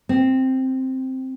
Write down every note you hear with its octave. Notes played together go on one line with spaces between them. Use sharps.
C4